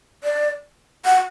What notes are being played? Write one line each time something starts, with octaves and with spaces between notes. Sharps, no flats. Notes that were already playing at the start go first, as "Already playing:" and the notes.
D5
F#5